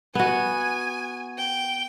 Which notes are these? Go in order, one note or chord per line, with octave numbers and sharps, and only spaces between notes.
B3 F#4 G#5
G5